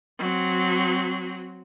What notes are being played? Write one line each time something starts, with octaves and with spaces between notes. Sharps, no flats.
F#3 C4